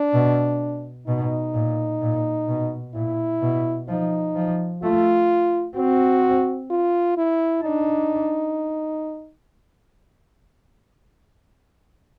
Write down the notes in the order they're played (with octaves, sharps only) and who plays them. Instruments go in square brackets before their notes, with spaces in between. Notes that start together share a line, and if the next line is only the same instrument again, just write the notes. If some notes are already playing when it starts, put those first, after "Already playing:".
Already playing: [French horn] D4
[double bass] B2
[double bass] B2 [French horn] D#4
[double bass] A#2
A#2
B2
[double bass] A#2 [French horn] E4
[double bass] B2
[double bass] F3 [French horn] D#4
[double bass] F3
[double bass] A3 [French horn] F4
[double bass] C4 [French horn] F#4
[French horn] F4
E4
[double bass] D4 [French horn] D#4